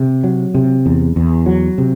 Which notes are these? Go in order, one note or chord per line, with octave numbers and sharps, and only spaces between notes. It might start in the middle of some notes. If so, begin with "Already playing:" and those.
Already playing: C3
F#3
C3
E2
E2
F#3
C3